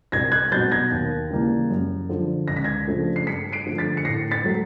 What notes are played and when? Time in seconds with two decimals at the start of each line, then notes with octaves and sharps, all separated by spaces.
0.12 C2 G#6 A#6
0.32 F#6 G#6
0.51 B2 F#3 G6 A6
0.72 G#6 A#6
0.91 D#2
1.30 C#3 E3 G3 A#3
1.70 F#2
2.09 D3 F3
2.48 C#2 A#6
2.56 B6
2.64 G#6 A#6
2.87 C#3 F3 A3 D4
3.16 C7
3.27 G2 B6 C#7
3.52 C7 D7
3.66 D3 F3 A3
3.78 A6 B6
3.97 C#7
4.05 A2 A#6 C7
4.31 A6 B6
4.45 F#3 A3